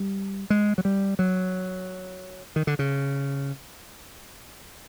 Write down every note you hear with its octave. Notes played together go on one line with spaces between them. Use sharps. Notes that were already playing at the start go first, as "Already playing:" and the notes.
Already playing: G3
G#3
F#3
G3
F#3
D#3
D3
C#3